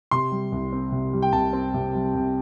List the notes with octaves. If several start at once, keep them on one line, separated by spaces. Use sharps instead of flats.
C3 C6
G3
C2
C4
C3
G3
G5
C2 A5
C4
C3
G3
C2